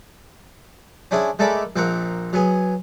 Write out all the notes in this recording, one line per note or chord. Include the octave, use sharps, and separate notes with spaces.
C#4 D4 E4 G#4 C5
G#3 A3 A4 A#4 D5 B5
A#1 A#3 C4 F5 F#5 A#5
F#3 B3 G#4